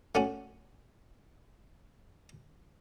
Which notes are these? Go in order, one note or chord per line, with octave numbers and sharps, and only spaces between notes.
A3 C#4 F#4